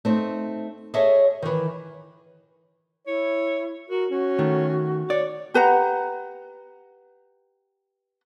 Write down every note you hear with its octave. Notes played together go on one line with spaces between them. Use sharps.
A3 C4 D#4
G#4 A4 C#5 D#5 E5
D#3 E3
E4 C#5
F#4 A#4
C#4 F#4
D#3 A3
C#5 D5
G4 B4 F#5 A#5